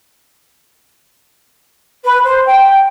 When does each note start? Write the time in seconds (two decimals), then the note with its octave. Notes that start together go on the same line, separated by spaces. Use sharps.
2.03 B4
2.24 C5
2.45 G5